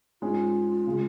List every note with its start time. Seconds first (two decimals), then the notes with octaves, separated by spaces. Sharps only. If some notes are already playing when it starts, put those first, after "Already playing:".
0.22 G#2 G#3 C#4 F4
0.87 C#3 G#3